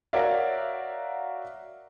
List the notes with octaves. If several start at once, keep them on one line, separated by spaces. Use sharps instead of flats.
F#4 A#4 C#5 D5 E5 F5